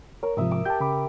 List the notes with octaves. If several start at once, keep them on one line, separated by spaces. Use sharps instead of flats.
A#4 C#5
G#2 C3 F3 E5 D#6
D6
G4 A5 G6
C#3 B5 D6